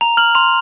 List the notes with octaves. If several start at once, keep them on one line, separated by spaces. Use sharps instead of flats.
A#5 F7
F6 F#7
C6 F7